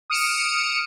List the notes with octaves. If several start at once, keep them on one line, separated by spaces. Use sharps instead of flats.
D#6 F6 C#7 D7 E7